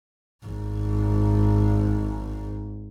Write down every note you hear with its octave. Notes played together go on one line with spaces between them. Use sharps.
G#1 G#2